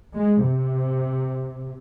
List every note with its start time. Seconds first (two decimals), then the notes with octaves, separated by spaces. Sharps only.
0.15 G#3
0.44 C3